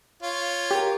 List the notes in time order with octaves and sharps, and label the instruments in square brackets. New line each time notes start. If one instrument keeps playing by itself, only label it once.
[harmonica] F4 C#5
[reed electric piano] G4 A#4